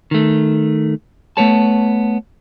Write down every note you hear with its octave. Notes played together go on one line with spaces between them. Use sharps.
D#3 A3
A3 B3 C#5 A5